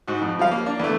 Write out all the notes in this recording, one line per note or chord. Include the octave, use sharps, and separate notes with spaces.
G#2 F#4
F2
F3 G3 F5
A#3
D4
E2 A3